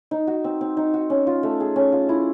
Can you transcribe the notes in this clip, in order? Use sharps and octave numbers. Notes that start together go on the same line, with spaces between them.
D#4
F#4
C4
C4
D#4
F#4
C#4
F4
A3
G#4
C#4
F4
E4